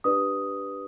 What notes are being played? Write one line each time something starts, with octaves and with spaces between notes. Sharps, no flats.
D4 G4 B4 D5 D#6